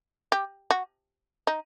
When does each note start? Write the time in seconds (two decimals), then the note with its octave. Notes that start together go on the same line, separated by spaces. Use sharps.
0.32 G4
0.71 F#4
1.47 D#4